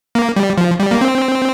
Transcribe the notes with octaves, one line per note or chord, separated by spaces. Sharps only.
A#3
G3
F3
G3
A#3
C4